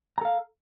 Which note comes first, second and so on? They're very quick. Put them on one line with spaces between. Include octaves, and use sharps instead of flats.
A#5 A4 F5